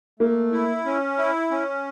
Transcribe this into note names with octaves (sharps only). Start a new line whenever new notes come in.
A3 A#3
E4
C#4
E4
C#4